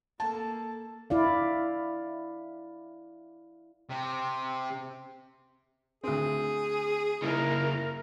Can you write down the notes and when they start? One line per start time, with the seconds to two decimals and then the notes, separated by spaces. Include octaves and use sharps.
0.20 A#3 A4 A5
1.10 E4 D5 F5
3.90 C3
6.04 D2 C4 G#4
7.23 C#3 A#3 D#4 E4 A#4